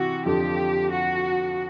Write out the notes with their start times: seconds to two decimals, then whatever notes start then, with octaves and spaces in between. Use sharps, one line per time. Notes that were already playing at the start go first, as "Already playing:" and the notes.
Already playing: C3 E3 F#4
0.26 F2 D3 F3 G4
0.91 F#4